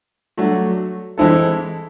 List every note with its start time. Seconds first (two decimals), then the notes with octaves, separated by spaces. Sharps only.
0.37 F#3 A3 D4 F#4
1.18 E3 G#3 C4 E4 A4